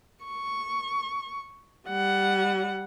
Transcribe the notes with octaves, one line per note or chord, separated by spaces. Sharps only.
C#6
G3 F#5